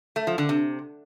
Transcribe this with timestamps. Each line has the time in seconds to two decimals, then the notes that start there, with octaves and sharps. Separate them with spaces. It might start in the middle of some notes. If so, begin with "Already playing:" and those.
0.16 A3
0.27 F3
0.38 D3
0.49 C3